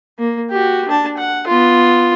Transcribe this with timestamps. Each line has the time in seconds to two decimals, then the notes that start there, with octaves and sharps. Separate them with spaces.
0.19 A#3
0.51 F#4 G4
0.88 D4 A5
1.17 F#5
1.47 B3 F4